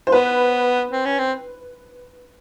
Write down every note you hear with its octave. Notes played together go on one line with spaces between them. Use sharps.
C5
B3 B4
C4
C#4
C4